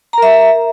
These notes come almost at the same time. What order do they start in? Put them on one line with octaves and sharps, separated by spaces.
A#5 A#4 E5